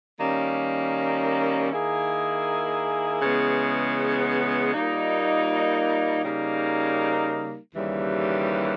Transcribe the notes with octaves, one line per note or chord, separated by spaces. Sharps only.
D#3 G3 A#3 C#4
D#3 A#3 E4 G#4
C#3 E3 G#3 B3
A#2 G3 A#3 D#4
C#3 G3 A#3 D#4 A#4
D#2 C#3 E3 G3